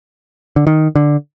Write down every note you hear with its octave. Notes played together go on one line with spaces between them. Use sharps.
D3
D#3
D3